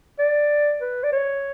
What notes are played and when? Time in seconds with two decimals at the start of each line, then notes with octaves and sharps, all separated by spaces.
0.19 D5
0.81 B4
1.03 D5
1.12 C#5